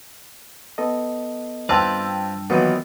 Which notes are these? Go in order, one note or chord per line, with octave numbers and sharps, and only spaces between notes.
B3 A4 D#5
G2 C4 F4 B4 D5 G5 A5 E6
A#2 D#3 E3 F#3 B3 F#4